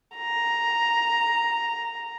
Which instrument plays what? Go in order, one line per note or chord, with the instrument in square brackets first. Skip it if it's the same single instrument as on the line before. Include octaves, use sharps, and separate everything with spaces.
[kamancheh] A#5